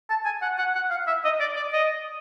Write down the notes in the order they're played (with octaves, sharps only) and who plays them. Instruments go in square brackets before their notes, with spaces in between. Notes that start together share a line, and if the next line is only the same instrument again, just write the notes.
[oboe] A5
G#5
F#5
F#5
F#5
F5
E5
D#5
D5
D5
D#5